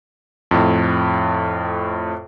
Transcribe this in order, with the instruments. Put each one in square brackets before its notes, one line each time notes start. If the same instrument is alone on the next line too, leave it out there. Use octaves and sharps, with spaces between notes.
[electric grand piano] F2 A2